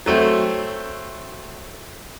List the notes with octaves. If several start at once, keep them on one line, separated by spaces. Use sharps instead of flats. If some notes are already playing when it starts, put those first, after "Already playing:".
F#3 A3 C4